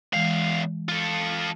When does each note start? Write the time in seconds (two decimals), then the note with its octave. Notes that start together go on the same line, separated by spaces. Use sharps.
0.13 E2 E3 G#3 F5
0.89 F4 A4